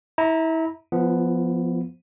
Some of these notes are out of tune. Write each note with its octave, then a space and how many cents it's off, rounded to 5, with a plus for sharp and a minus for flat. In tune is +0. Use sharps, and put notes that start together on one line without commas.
E4 -30 A#5 +0
F3 +0 B3 +0 E4 +45